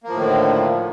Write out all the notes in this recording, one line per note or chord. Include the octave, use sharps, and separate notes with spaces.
A2 D3 D#3 F3 A#3